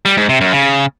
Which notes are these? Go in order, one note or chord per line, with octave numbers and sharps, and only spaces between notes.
G3
G#2
C3
F#2
C#3